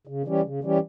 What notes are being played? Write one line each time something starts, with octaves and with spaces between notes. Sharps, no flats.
C#3
E3 G3 C#4 G4
C#3
E3 G3 C#4 G4